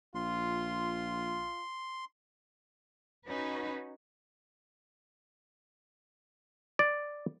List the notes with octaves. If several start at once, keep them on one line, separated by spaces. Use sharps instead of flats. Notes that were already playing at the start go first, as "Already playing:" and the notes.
A#1 F4 C6
C#4 D#4 F#4 B4
D5